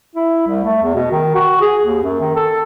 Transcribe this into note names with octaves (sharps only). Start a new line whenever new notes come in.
E4
C2
A3
E2
B2
D#3
F#4
G#4
D#2
F#2
D#3
A4